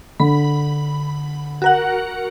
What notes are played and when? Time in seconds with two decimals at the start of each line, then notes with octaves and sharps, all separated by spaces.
0.20 D3 B5
1.62 F#4 A#4 F#5